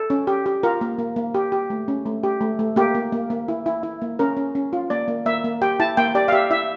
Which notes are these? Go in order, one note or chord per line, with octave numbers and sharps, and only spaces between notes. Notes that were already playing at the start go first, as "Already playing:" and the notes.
Already playing: A4
C#4
G4
G4
F4 A#4
A#3
A#3
A#3
G4
G4
A3
C#4
A3
G4
A3
A3
A#3 G4
A#3
A#3
A#3
E4
E4
E4
A#3
C#4 A#4
C#4
C#4
F4
A#3 D5
A#3
A#3 E5
A#3
G4 G5
E4 A5
A#3 G5
G4 D5
F5
G4 E5
E4 E5